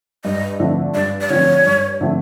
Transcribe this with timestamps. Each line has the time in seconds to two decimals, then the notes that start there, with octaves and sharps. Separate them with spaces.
0.24 G2 D#5
0.60 D3 F3 A3 C4
0.94 G2 D5
1.21 D5
1.30 D3 F3 A3 C4 C#5
1.65 G2
2.01 D3 F3 A3 C4